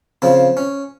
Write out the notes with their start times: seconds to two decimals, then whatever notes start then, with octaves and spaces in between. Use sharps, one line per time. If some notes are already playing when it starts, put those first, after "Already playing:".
0.22 C#3 F3 C4
0.57 C#4